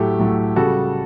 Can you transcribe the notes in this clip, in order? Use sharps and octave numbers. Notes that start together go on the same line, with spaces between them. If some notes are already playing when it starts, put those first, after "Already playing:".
Already playing: A2 F#3 A3 G4
A2 F#3 A3
C#3 G3 F#4 A4